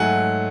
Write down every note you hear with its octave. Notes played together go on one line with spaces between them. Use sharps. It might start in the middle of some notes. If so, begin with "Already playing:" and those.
Already playing: G#2 F#3 A3 F#5 G#5